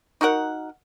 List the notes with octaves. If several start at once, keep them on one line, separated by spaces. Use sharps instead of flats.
D#4 F#4 A#4 F#5